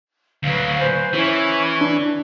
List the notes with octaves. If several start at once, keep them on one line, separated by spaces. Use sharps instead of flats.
D2 F#3 B4 F5
B4 C5 G#5
E3 C#4 E4 C#6
D4